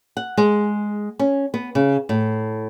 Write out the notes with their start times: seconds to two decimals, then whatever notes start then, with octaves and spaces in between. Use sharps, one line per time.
0.17 F#5
0.37 G#3
1.19 C#4
1.54 B3
1.75 C#3
2.09 A2